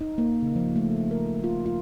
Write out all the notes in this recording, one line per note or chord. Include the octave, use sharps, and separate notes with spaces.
D#4
A#3
C#3
F3
A3
A#4
F4
F4